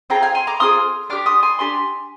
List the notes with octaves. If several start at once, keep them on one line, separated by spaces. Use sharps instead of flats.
C4 F4 G#4 G5 A#5
F5 G#5
G#5 C6
A#5 D6
C4 F4 G#4 C6 D#6
D4 G4 D6 F6
C6 D#6
G#5 C6
D4 G4 G#5 C6